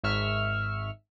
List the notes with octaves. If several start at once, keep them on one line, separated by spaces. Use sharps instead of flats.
G#1 G#2 E5 C#6 E6 F6